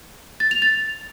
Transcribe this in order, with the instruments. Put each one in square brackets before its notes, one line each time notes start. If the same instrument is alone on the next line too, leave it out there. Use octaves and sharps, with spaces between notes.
[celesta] A6
F7
A6